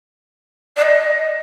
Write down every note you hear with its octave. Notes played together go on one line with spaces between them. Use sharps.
D5
D#5